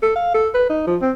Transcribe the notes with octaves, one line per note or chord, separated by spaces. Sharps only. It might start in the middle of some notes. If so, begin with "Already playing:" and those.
A4
F5
A4
B4
D#4
F3
C4